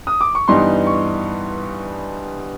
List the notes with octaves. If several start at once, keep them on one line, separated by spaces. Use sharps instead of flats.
D#6
D6
C#6
G2 E3 G3 B3 D#4 C6
C#6